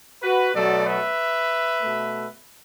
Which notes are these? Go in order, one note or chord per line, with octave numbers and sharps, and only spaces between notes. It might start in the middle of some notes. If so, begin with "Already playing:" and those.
F#4 B4
B2 F#3 A3 A4 D5
B4 E5
B2 A3